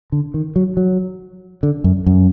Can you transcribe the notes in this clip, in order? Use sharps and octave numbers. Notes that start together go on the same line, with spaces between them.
D3
D#3
F#3
F#3
D3
F#2
F#2